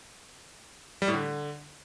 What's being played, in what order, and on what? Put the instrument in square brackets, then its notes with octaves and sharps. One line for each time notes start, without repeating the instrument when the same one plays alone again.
[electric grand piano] G3
A2
D3